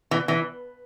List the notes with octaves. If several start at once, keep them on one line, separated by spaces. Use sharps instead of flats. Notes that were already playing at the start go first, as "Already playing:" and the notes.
E3
E3